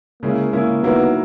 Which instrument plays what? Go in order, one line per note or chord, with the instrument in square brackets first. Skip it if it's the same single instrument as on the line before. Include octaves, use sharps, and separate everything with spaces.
[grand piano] C#3 G#3 C#4 E4 [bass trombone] A#3
[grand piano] C#3 G#3 C#4 E4 [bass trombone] A#3
[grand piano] D#3 F#3 A#3 E4 [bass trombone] B3